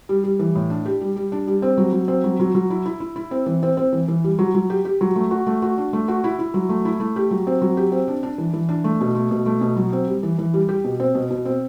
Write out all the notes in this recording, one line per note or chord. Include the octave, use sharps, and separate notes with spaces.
G3
G3
E3
A2
D4
G4
G3
G3
D4
G3
C4
F#3
F#3
C4
F#3
F#3
F#3
E4
E4
E4
E4
C4
E3
C4
C4
E3
E3
G3
F#3
F#3
G4
G4
F#3
A3
F#4
A3
F#4
D4
A3
F#4
E4
E4
F#3
A3
E4
A3
G4
F#3
C4
F#3
G4
C4
D4
D4
E3
E3
D4
A3
B2
A3
B2
A3
B2
F#3
C4
G3
E3
E3
G3
G4
B2
C4
B2
B2
C4